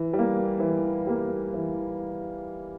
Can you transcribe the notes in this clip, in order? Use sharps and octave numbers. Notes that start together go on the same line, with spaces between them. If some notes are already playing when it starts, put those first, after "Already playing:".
Already playing: E3
G3
A#3
E3
G3 A#3
E3